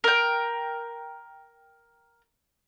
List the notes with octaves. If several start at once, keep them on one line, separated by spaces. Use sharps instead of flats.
A#4 G5